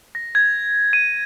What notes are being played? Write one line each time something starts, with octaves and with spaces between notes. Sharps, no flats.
A#6
G#6
D#7